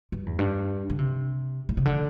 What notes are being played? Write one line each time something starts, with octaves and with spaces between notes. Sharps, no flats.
G2
E2
G2
D3
C3
A2
C3
D3